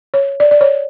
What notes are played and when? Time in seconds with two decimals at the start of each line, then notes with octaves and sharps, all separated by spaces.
0.14 C#5
0.40 D5
0.51 D5
0.61 C#5